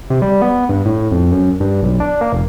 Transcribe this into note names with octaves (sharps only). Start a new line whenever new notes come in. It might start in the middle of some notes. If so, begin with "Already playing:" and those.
C3
G3
B3
G2
A2
F2
F#2
G2
B1
D4
A#3
F1